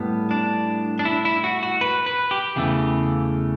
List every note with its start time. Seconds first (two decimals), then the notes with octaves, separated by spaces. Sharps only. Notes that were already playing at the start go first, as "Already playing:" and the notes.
Already playing: A2 G3 B3
0.31 D4
0.99 D4
1.05 E4
1.25 E4
1.44 F#4
1.63 F#4
1.81 B4
2.06 B4
2.31 G4
2.56 E2 C#3 E3 A3